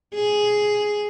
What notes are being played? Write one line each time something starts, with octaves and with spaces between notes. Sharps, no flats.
G#4